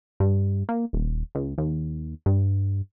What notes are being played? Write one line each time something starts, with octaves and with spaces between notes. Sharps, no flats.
G2
A#3
D#1
C#2
D#2
G2